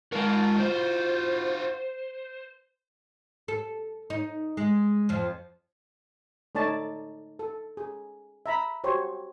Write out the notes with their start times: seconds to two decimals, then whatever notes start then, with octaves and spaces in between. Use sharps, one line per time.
0.12 G#3 F4 F#4 A#4
0.60 C5
3.48 A4
4.10 D#4
4.57 G#3
5.09 F2 F3
6.55 A3 D#4 C#5 D5 A5
7.39 A4
7.77 G#4
8.46 E5 A#5 B5
8.84 F#4 G4 C5 C#5